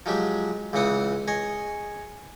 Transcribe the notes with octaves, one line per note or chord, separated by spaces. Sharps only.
F3 F#3 G#3 G4
C#2 C#3 E3 C4 F#5 D#6
G#4 C#5 D#5